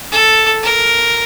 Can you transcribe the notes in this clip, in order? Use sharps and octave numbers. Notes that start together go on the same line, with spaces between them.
A4
A#4